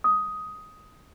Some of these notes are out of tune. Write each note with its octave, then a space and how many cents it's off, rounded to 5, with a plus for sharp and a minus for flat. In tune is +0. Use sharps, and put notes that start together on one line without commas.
D#6 +10